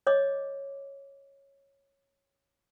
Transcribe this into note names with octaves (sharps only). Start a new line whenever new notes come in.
C#5 D#5 D6